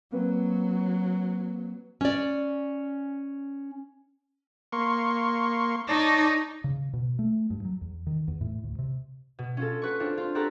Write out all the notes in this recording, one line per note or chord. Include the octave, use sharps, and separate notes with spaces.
F#3 A#3 C4 B4
C#4 D5
A#3 C6 C#6
D#4 C#5 D5 A5
C#3
B2
A3
G2
F#3
E2
D#3
E2
A2
D2
C3
B2
C#4 F4 A4
F#4 B4 C#6
C4 D4 F4 C5
F4 C6
F#4 G4 A4 B4 A#5 B5